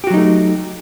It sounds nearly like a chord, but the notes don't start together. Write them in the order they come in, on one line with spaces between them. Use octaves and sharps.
G4 F#4 F#3 D#4 A3